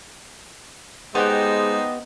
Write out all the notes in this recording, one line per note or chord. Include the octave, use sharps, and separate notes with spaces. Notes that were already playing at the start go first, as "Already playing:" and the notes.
G#3 B3 D#4 G4 C5 D#5